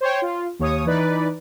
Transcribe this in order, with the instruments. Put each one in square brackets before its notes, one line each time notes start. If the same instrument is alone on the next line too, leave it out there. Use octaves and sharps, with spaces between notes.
[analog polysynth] C5 C#5 G5
F4
D#2 C#5 D#6
E3 D#4 B4 D5